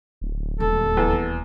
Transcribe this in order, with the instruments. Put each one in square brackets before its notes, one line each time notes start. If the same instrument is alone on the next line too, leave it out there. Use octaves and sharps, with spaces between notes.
[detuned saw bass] D1
[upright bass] D#1 [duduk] A4
[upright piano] E2